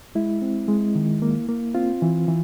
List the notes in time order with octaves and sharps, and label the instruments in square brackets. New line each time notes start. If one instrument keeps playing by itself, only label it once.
[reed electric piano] G#3 E4
C4
G#3
D#3
A#3
A#3
C4 F4
E3
E3